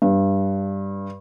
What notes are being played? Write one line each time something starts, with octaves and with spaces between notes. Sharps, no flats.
G2